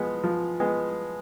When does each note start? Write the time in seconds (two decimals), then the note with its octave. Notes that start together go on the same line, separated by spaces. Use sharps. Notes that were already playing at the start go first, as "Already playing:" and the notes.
Already playing: F3 G#3 B3
0.24 F3
0.60 G#3 B3